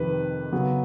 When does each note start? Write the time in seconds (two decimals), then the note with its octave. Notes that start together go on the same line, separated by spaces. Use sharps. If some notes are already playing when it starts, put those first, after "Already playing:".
Already playing: F2 C3 D#3 B4
0.52 C#3 F#3 B3